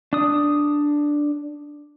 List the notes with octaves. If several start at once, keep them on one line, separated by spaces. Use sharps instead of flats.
D4 D#6